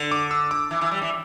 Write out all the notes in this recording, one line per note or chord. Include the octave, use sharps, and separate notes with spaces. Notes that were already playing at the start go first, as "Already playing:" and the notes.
Already playing: D3
D6
E6
D6
E3
E3
G3
E3